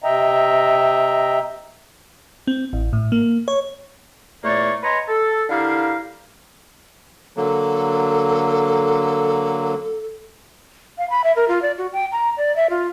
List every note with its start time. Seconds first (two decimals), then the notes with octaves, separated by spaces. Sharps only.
0.04 C3 D#5 E5 G5 A#5
2.47 C4
2.73 A1
2.93 A2
3.12 A#3
3.48 C#5
4.44 E2 A#2 A3 A#3 C#5 D5
4.83 B4 C#5 D#5 G#5 A#5 C6
5.09 A4
5.50 D3 E4 G4 A#4 F5
7.37 D3 F#3 A#3 A4
10.98 F5
11.10 B5
11.24 E5
11.36 A#4
11.48 F4
11.62 D5
11.78 F#4
11.93 G5
12.12 A#5
12.37 D5
12.56 E5
12.70 F4